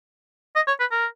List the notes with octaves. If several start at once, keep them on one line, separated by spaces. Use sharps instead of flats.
D#5
C#5
B4
A#4